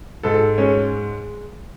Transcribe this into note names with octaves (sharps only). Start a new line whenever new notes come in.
G#2 A4
G#3 C#4